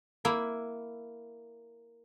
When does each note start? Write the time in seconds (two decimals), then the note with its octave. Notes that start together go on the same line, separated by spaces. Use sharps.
0.25 A#3 E4 B5